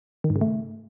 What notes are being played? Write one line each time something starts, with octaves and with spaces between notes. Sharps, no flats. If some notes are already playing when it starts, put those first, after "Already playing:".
D#3
G#2
C#3
A3